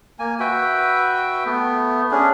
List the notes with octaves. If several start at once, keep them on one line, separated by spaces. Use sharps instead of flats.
A#3 G#5
F#4 B4 E5 G5
A3 B3
C#4 D4 G#4